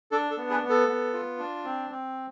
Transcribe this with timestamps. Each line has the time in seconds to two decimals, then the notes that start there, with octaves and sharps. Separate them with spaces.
0.11 D4 A4
0.31 A4
0.37 B3
0.50 G#4 B4
0.63 B3
0.70 A4
0.88 B3
1.13 F4
1.39 D4
1.65 C4
1.90 C4